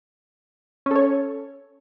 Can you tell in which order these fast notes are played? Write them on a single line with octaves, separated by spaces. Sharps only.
C#4 A4 C#5